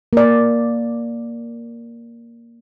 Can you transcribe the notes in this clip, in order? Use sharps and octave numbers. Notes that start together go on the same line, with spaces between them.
A#3 D5